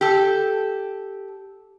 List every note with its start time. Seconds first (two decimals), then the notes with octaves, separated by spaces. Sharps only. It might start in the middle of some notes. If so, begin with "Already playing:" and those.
0.01 G4 A4